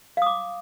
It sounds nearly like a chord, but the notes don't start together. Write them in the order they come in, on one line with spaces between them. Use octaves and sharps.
F5 D#6 D6